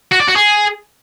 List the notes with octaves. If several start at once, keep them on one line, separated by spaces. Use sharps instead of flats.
F#4
D5
F#4
G#4